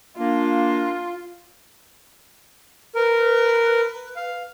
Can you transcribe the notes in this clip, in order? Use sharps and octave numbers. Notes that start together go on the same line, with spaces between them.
A#3 D4 F4
A#4 B4
F5